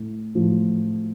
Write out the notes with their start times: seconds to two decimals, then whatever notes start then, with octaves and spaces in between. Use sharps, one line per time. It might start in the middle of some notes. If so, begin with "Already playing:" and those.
Already playing: A2
0.35 A2 F3